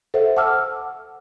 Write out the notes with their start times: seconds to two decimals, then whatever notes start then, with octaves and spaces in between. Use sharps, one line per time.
0.14 A4 C5 E5 F#5
0.37 F#5 A5 D6 E6 F6